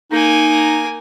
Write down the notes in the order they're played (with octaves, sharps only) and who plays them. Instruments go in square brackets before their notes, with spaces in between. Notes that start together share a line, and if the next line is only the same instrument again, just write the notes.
[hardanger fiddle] A#3 G#5 [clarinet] D#4